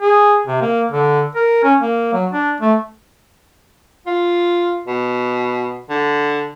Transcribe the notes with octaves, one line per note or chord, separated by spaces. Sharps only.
G#4
C3
A#3
D3
A#4
C#4
A#3
F#3
D4
A3
F4
B2
D3